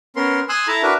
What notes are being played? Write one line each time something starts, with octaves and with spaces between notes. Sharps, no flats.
B3 C#4 A#4 C6
G#5 C6 D#6 E6 F#6
E4 A4 E5 A5 A#5
D4 F#4 A#4 B4 E5